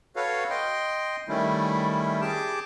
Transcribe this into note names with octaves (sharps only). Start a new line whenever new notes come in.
F#4 A4 B4 C#5 F5
D#5 G5 C6
D#3 G3 A3 C#4 E4
G4 G#4 A5 D6